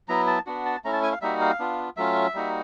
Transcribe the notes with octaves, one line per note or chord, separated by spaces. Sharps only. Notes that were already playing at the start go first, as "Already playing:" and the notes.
F#3 B3 E4 A#5
A5
B3 D4 F#4
A5
A3 C#4 E4 A#5
A5
G#5
F5
G3 A#3 D#4 F#4 E5
F5
B3 D4 F4
F#3 A3 C#4 F4 E5
G3 A#3 D#4 F#4